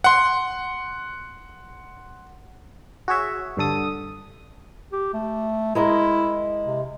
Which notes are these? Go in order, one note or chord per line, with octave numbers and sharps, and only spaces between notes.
F#5 C6
F#4 G#4 C#5 E5
G2 D3 A4 D#6
G4
A3
G#3 E4 A#4 D#5
C3